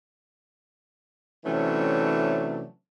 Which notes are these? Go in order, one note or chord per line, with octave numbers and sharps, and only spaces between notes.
C3 E3 F#3 A3 C#4 D4